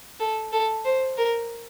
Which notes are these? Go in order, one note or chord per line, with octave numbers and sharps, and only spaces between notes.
A4
A4
C5
A#4